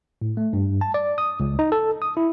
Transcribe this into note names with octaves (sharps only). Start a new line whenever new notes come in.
A2
A3
G2
A5
D5
D#6
C#2
D#4
A4
D#6
E4